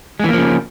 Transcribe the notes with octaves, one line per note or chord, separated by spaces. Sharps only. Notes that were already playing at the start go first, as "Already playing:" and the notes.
C#3 E3 F3 G#3 A#3